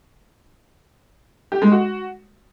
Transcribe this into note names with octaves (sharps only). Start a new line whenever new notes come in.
G4
G#3
F#4